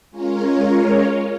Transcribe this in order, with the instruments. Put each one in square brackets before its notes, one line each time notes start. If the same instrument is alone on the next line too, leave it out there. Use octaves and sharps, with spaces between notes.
[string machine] G#3 C#4 F4 A#4 C#5